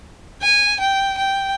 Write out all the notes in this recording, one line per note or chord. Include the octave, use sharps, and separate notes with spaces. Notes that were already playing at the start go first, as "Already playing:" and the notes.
G#5
G5
G5